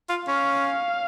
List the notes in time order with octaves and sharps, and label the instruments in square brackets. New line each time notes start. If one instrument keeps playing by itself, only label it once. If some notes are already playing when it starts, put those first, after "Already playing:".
[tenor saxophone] F4
[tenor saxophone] C#4 [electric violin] F5